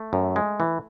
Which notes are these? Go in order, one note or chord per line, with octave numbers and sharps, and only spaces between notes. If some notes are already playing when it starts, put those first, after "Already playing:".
Already playing: A3
F#2
G#3
E3